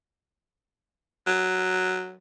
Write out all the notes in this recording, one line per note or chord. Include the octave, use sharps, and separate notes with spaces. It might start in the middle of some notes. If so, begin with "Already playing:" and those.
F#3